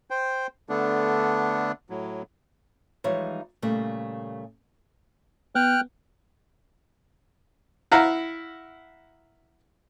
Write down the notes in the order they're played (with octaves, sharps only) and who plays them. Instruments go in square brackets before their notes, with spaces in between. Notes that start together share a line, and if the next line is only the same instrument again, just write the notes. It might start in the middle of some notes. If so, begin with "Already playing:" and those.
[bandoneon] C5 G5
D3 A3 B3 D4
A2 F#3
[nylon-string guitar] E3 F3 G3 G#3 D#4 C#5
A#2 C#3 G3 A3
[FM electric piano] B3 [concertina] G5 F6 F#6
[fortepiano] E4 F5 F#5 A#5